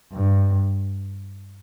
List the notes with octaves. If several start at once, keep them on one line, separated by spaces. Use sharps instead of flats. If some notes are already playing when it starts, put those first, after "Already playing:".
G2